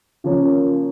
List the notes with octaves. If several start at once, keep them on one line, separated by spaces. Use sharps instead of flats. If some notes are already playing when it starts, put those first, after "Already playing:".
C#3 F3 A#3 C#4